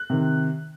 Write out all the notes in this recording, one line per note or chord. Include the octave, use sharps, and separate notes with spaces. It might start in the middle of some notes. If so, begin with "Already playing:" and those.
Already playing: F#6
C3 D#3